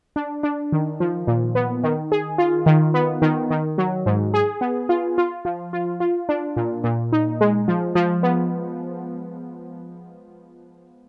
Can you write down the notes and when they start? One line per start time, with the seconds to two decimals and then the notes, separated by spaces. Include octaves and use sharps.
0.16 D4
0.43 D4
0.72 D#3
1.00 F3
1.27 A#2
1.55 B3
1.83 D#3
2.12 G#4
2.38 F4
2.66 D#3
2.94 B3
3.22 D#3
3.51 D#3
3.78 F#3
4.06 G#2
4.34 G#4
4.61 B3
4.89 F4
5.18 F4
5.45 F3
5.73 F4
6.00 F4
6.29 D4
6.57 A#2
6.84 A#2
7.12 D#4
7.41 G#3
7.68 F3
7.95 F3
8.23 B3